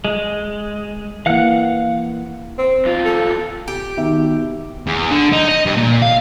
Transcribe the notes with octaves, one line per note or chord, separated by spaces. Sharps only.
G#3
E3 A#3 F5 F#5 F#6
C4
E2 F4
A4
G4
B2 D#3 E5
E2
D3
D#4
D#5
G2
A#2
F5